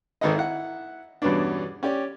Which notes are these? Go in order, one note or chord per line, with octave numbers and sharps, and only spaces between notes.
G#1 D#3 A4 B4 D#5
E4 F#5
E2 G2 B2 B3 C#4 D4
C#4 G4 D5